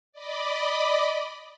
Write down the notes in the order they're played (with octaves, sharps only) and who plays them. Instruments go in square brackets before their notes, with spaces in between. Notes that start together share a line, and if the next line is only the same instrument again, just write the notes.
[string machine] D5 D#5 B5 D6